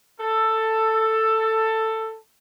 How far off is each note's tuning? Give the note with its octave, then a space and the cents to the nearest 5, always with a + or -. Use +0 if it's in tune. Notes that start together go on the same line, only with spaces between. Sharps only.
A4 +10